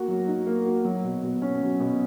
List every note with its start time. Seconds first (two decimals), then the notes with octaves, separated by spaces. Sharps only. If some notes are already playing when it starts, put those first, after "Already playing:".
Already playing: A#3 F#4
0.08 F#3
0.27 D#4
0.47 A#3
0.66 F#4
0.85 F#3
1.04 B2
1.23 B2
1.42 C#4
1.61 F#3
1.80 B2